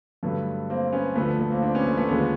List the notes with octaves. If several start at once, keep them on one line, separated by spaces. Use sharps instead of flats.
G2 D3 F#3 A3 B3
A#3 C4
B3 C#4
D2 D3 F3 A3 B3
A3 B3
A#3 C4
C4 D4
B3 C#4
A3 B3
A3 B3
D#2 D3 F3 G#3 B3 C#4